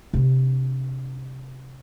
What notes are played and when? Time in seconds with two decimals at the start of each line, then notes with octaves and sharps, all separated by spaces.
0.14 C3 D4